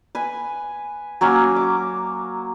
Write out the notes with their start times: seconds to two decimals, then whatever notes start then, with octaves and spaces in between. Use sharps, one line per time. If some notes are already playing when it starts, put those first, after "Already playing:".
0.15 B4 G#5
1.21 F#3 A#3 C#4
1.56 D6